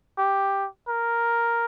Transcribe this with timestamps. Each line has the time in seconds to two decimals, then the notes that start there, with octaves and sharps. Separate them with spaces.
0.18 G4
0.88 A#4